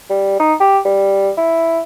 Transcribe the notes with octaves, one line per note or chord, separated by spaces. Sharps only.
G3
D#4
G4
G3
E4